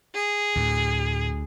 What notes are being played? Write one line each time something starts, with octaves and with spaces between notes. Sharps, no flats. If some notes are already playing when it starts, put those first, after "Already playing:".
G#4
D2 A2